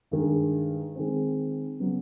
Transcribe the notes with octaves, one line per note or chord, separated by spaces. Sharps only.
G2 D#3 G#3
D#3 G#3 C4
C#3 F#3 B3